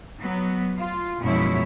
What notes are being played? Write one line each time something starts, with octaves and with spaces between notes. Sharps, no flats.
F#3 B3
F4
F#2 B2 F3 G#3 E4 C#5